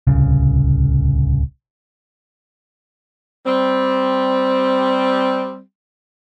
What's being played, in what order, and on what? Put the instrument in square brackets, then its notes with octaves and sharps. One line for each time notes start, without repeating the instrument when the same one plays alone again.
[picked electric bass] D1 C2 C#3
[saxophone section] G3 C4